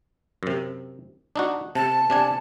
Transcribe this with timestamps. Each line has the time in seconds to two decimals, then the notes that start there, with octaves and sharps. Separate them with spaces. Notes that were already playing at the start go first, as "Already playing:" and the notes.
0.43 F#2 C3
1.36 D4 D#4 F#4
1.75 C3 A5
2.10 C3 D4 G#5